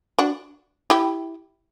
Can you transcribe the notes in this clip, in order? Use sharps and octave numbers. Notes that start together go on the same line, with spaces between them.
D4 F#4
E4 G4